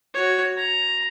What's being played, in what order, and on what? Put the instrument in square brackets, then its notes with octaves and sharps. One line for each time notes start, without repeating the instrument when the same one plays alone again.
[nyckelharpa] F#4 C#5
A#5